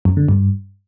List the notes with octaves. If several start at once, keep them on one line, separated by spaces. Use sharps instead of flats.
F#2
D3
G2